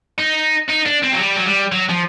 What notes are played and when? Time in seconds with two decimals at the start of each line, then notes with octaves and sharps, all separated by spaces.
0.18 D#4
0.70 D#4
0.86 D4
1.04 C4
1.13 F#3
1.20 G3
1.37 F#3
1.46 G3
1.72 F#3
1.89 F3